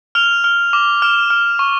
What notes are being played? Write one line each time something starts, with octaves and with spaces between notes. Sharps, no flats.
F6 F7
F6
D6
F6 E7
F6
C#6